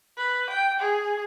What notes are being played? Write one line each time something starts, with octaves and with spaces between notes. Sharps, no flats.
B4
G5
G#4